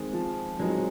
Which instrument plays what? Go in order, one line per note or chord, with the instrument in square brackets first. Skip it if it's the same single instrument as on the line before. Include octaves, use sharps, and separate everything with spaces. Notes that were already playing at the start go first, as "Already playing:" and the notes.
Already playing: [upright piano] D#3 G#3 C4
[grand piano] F3
[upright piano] D#3 G#3 C4 [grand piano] F#3